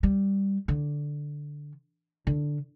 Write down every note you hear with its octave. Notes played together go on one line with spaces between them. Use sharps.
G3
D3
D3